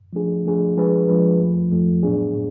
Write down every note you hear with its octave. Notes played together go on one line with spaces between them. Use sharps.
F3 A3 D4 G#4
F3 A3 D4 G#4
F3 G#3 D4 G#4 B4
F3 G#3 D4 G#4 B4
F2 F3 A3
F2 F3 A3
A2 F#3 B3 D4 G#4
A2